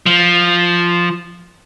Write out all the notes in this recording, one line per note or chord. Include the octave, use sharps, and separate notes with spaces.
F3